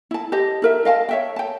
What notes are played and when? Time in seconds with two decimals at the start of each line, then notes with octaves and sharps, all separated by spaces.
0.11 E4 A5
0.32 G4 C5 D#5 A5
0.62 E4 A#4 E5
0.85 D#5 F5 G5 A5
1.09 C#5 E5 G5
1.36 G5 A5